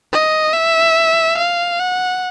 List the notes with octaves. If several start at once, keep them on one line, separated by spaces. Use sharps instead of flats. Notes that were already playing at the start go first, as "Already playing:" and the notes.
D#5
E5
F5
F#5